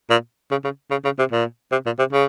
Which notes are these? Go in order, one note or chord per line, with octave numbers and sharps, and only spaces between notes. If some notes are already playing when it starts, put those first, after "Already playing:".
A#2
C#3
C#3
C#3
C#3
C3
A#2
C3
A#2
C3
C#3